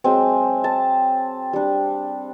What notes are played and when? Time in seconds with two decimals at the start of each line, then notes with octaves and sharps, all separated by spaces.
0.04 F#3 G#3 C4
0.64 A5
1.53 G3 D4